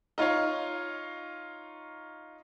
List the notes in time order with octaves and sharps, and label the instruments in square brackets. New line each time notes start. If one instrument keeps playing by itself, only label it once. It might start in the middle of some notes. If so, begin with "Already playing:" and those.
[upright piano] D#4 F4 C#5 F5